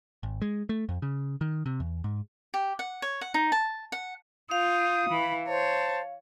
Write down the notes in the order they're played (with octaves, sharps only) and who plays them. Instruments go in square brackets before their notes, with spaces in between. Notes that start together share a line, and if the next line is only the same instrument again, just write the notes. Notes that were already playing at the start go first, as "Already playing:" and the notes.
[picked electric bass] G#1
G#3
A3
F2
C#3
D#3
C3
E2
G#2
[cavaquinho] G4
F#5
C#5
F#5
D#4
A5
F#5
[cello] F4 [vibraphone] F5 [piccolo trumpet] D#6 [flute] G6
[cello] E3 [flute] B5
[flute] C5 [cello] C#5 [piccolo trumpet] A5